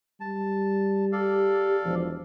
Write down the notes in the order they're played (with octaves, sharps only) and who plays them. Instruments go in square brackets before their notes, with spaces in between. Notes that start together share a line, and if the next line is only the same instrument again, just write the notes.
[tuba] G3 [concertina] A5
[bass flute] G4 [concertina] A4 D5 F5
[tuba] E1 [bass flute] F3